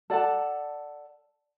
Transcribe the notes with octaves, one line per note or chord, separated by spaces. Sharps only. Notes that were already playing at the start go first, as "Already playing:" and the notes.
A4 D5 F#5 A5